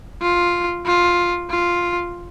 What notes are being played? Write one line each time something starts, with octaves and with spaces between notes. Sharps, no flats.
F4
F4
F4